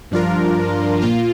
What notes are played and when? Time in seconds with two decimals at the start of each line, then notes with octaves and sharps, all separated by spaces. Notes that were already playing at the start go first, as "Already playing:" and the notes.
0.11 G2 F3 D4 F4 A#4
1.02 A#2 A#3 F4